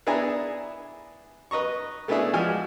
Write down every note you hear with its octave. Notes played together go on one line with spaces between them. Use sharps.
B3 D4 E4 G#4 G#5 A#5
B4 D#5 A#5 C#6
A3 B3 C#4 D4 E4 G#4
E3 F3 G#3 F#4 G#5 F6